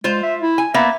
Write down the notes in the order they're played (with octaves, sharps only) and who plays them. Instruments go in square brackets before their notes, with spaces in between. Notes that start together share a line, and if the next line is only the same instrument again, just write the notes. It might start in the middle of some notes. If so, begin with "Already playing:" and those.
[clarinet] G#3 [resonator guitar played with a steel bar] F4 C5
[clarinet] E5
E4
[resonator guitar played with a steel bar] G#5
[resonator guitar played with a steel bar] A#3 B3 [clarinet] E5